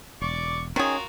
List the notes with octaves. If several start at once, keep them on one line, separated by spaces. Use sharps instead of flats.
E1 D5 C#6 D6
D#3 C4 C#4 F4 F#4 G#4 A#4